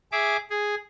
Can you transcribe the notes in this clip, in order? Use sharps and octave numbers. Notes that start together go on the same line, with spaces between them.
G#4 E5 D6
G#4